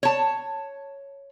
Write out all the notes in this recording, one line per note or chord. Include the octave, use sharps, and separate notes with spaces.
C#5 A5